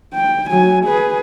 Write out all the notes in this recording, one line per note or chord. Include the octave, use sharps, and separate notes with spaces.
G5
F#3 G#5
G#4 B4